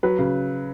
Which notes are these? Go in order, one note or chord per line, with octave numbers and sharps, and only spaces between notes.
F#3 B4
C#3